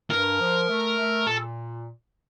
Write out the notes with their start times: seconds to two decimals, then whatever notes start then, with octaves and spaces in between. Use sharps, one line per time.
0.10 G2 A#4
0.40 F3
0.69 A3
0.98 A3
1.27 A#2 A4